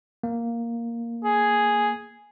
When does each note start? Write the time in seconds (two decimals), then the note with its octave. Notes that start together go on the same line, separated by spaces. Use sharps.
0.23 A#3
1.24 G#4